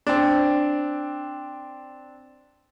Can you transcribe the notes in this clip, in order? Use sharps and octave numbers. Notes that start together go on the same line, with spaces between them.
C4 D4